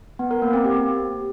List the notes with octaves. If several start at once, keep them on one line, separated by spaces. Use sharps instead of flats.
B3
A#4
A#3
C4
G4